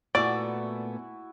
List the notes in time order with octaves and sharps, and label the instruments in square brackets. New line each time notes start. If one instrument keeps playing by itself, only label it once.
[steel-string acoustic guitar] A#2 A3 B3 [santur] E4 F#4 G#5 [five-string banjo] D5